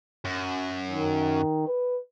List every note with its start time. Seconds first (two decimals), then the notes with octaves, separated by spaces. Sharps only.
0.25 F#2
0.90 D#3
1.67 B4